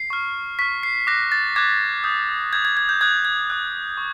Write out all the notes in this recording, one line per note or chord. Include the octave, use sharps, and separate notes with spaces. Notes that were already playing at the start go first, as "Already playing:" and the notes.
Already playing: C7
C#6 F6
C#6 F6 B6
C7
D6 F#6 A#6
A6
D6 F#6 G#6
D#6 G6
D#6 G6 G#6
G#6
G#6
G6
D#6 F#6 G#6
G#6
D#6 F#6
C#6